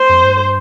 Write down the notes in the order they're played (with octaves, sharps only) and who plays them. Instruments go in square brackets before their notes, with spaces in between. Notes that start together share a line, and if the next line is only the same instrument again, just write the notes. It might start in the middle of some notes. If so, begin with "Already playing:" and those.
Already playing: [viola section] C5
[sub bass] F2
G2